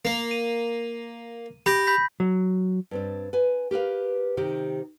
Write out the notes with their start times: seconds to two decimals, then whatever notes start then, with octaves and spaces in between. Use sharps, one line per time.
0.05 A#3
0.31 D#7
1.66 G4 B5 G6 A#6
1.87 B5 G6 B6
2.20 F#3
2.91 G2 C4 D4
3.33 B4 G#5
3.71 G4 A#4 B4 F5
4.37 C3 D#3 G4